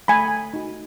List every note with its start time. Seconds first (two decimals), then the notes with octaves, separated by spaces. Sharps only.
0.08 A3 G#5 B5
0.54 D#4 F#4